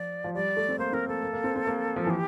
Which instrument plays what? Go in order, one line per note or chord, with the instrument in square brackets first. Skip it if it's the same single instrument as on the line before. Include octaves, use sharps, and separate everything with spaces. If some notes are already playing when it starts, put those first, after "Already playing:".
Already playing: [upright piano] F3 [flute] D5
[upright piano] F3
[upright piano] G3 [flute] D5
[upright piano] A3
C4
[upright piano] A#3 [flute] C5
[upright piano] C4 [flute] A#4
[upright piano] A#3 [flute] A4
[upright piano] A#3
A#3
C4
C4
A#3
F3
[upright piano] E3 [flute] G4